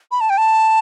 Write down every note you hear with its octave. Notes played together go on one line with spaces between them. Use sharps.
B5
A5
G5
A5